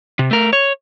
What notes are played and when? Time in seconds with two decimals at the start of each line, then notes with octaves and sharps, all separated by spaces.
0.19 C3
0.31 A3 A#4
0.53 C#5